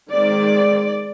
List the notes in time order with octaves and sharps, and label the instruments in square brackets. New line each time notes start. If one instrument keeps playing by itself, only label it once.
[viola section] D#3 G#3 C4 D5